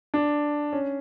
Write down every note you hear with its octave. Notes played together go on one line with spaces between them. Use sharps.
D4
C#4